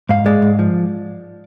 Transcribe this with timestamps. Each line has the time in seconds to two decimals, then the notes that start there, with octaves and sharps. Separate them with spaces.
0.09 G#2 F5
0.26 G#3 D5
0.42 G#2
0.59 F3